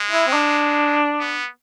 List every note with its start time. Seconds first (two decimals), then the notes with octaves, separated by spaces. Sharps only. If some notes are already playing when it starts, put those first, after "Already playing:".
Already playing: G#3
0.11 E4
0.27 C4
0.33 D4
1.20 B3